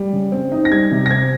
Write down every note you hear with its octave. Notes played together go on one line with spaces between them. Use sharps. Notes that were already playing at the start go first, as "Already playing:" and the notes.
Already playing: G3
C#3
C4
D#4
A#6
G3 G#6
C3
A#6
C4 G#6